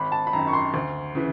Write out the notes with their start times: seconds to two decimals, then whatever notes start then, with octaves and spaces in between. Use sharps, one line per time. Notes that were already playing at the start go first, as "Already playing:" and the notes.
Already playing: G#1 B5
0.12 A5
0.27 B5
0.33 F#2 D#3 A#5
0.47 C#6
0.53 C6
0.74 D2
1.15 C#3 E3